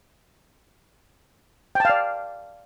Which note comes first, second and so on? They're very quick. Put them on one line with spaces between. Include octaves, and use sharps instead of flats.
G5 A5 F5 D5